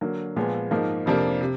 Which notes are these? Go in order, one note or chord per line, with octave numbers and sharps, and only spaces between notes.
D3 F#3 A#3
A#2 F3 G#3 B3
G#2 F3 A#3 D#4
F2 C3 F3 A#3 D4
C3